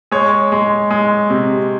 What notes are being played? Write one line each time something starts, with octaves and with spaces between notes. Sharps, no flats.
G#3 C#5
G#3
G#3
C3